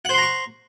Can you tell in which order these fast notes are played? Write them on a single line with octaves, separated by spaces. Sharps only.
F#5 C5 C6 A#5 C#6